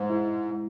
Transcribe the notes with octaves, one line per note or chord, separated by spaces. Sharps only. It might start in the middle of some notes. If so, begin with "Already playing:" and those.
Already playing: G#2 G#3
E4